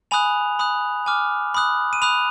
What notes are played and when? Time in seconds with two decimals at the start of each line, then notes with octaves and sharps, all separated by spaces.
0.11 G#5 B5 D#6 F#6 F7
0.59 B5 D#6 F#6
1.06 G#5 D6 F6
1.54 B5 D#6 F#6
1.93 D#7
2.02 B5 D#6 F#6 F7